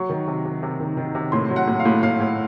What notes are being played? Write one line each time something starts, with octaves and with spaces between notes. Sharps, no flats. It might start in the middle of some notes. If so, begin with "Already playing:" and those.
Already playing: F#3 C#6
D#3
C3
C3
C3
D#3
D#3
C3
A2 C6
F#3
F#5
A2
F5
A2
A2 F5
A2